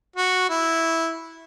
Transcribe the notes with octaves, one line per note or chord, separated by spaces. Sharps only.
F#4
E4